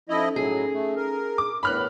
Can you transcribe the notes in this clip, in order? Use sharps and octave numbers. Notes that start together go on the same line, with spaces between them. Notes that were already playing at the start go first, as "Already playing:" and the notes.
F3 C#4 D#4 E4 A4 D#5
A2 F#3 G#4
A3
A#4
D6
E2 A2 A#4 B4 C#5 B5 F6 F#6